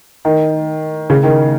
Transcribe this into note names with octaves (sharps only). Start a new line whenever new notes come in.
D#3
C#3
D#3